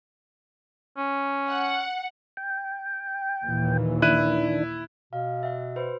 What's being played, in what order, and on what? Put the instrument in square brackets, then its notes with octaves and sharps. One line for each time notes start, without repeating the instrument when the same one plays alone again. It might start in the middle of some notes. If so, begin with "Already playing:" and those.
[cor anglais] C#4
[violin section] F#5
[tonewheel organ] G5
[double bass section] D#2 A#2 E3
[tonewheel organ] D#3 D4 [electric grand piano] E4 F#6 D#7
[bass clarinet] B2 [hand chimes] F5
[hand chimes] E5 F#5
F#4 B4 C5